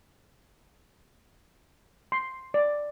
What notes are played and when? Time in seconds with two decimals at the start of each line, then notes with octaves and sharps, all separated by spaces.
2.12 C6
2.54 D5